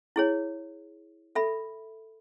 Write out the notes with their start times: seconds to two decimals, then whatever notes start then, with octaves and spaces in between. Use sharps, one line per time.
0.16 E4 G#4 C#5
1.35 A4 E5 B5